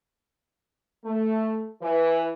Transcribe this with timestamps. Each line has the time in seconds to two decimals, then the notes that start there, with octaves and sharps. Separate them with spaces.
1.05 A3
1.82 E3